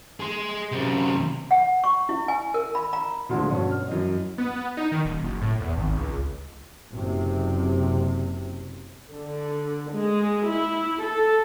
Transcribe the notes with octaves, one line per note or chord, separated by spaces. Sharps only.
G#4 C6
F#2 C3
F#5
C#6
E4
G#5
A#4
B5
A#5
D2 A#2 D3 F3 G#3
G2 B2 C#4
F6
F#2 E3 D#5
B3
D#4
D#3
D#1
F#1
A2
E2
G#1
C#2
F#1 C3
D3
G#3
E4
A4